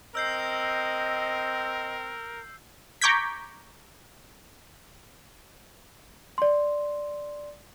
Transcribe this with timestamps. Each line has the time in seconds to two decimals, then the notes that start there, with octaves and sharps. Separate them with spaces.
0.15 C4 A#4 D#5 E6 G6 C7
3.02 A#5 C#6 D6 G6 G#6 B6
6.38 D5 C6